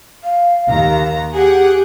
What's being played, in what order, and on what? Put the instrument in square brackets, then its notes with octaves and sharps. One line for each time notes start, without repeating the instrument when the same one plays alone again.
[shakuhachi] F5
[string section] D#2 D#3 A#5
[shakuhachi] G4 [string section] G#4 F#5 G5